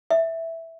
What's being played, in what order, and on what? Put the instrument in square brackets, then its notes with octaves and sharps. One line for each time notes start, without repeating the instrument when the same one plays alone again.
[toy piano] E5